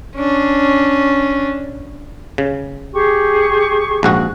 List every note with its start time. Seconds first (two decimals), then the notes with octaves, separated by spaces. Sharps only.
0.16 C#4 D4
2.38 C#3
2.93 G4 G#4 C#6
4.03 A#1 G#2 F#4 F#6